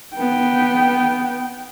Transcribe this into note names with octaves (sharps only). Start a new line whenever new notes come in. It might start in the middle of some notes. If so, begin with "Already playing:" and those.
B3 G5